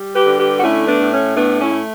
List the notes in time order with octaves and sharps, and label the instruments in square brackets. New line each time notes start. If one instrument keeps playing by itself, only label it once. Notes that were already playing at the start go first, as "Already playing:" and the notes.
Already playing: [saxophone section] G3
G4 B4
D3
G4 B4
F#4
A3 C#4 E4
B3 D4
A2
C#4
A3 B3 D4
C#4 E4
A3